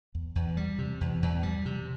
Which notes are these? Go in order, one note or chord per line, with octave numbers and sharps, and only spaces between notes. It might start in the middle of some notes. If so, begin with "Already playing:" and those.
E2
E2
G3
C3
E2
E2
G3
C3